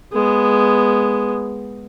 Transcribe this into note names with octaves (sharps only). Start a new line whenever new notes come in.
G#3 B3